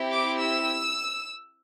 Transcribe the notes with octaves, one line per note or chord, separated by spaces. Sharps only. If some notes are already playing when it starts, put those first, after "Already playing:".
Already playing: C4 E4 G4
D6
E6